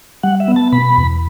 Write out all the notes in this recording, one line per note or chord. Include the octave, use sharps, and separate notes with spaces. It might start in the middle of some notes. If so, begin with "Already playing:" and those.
G3 F#5
E5
B3
A5
B2 B5
E2